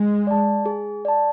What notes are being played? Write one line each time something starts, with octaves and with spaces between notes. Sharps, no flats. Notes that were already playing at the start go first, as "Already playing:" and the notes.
Already playing: G#3
D5 A5
G#4
D5 A5